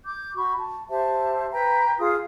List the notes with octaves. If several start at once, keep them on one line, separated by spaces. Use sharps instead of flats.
D6 G6
F#4 B5 C#6
A5
G4 C5 E5 A5
B4 G5 A#5
F4 G#4 D#6